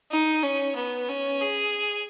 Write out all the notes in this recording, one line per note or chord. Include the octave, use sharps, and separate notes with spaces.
D#4
C#4
B3
C#4
G#4